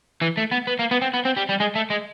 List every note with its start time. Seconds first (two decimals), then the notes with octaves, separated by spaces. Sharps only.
0.21 E3
0.37 A3
0.52 B3
0.67 B3
0.79 A#3
0.91 B3
1.02 C4
1.14 B3
1.25 C4
1.37 G3
1.49 G3
1.60 G#3
1.75 A3
1.90 G#3